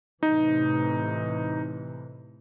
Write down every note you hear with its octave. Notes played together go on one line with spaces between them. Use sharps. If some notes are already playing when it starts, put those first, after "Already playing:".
A2 C3 E3 D#4